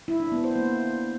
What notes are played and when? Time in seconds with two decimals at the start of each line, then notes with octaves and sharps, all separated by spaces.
0.08 E4
0.20 D4
0.32 B3
0.44 C5
0.56 A#3